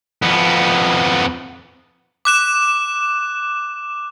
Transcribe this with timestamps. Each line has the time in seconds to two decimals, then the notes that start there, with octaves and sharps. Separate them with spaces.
0.23 F2 B3
2.25 D6 F#6 E7